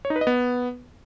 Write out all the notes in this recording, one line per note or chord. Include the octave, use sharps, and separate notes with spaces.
C#5
D#4
B4
D#5
B3